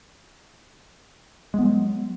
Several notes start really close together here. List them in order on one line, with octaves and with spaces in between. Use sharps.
G#3 B3 F#3